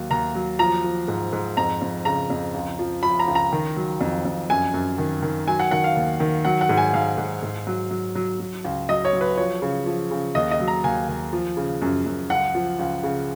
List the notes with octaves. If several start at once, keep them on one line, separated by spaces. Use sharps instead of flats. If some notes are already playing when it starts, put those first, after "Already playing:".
Already playing: D#2 F#3
D#2 A#5
F#3
F3 A#5
F3
G#2
G#2
F2 A#5
F2
C#3 A#5
F2
C#2
F3
F3 B5
A#5
C#2
A#5
D#3
F#3
F2
F2
F#2 G#5
F#2
D#3
D#3
F#3 G#5
F#5
D#3 F#5
F5
D#2
D#3
F#3 F#5
F#5
G#2
G#5
G#2 F5
G#2
G#2
F#3
F#3
F#3
F#3
C#2
F#3 D#5
C#5
F#3
B4
F3 C#5
C#3
F3
C#3
D#2 D#5
D#5
F#3
A#5
D#2 G#5
D#2
F3
C#3
F#2
F#2
C#2 F#5
F3
C#2
C#3